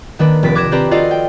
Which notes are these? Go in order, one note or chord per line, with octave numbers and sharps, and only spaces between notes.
D#3 A#3 D4 B4
F1 C3 A6 B6 D7
D6 F#6 G#6 A#6 D7 E7
C4 D4 G4 B4 D5 A#5
F4 F#4 A4 D5 D#5 F5
G5